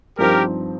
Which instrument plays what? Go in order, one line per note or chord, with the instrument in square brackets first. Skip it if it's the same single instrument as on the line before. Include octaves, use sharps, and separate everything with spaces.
[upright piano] G2 F3 C4 D#4 [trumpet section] G4 A#4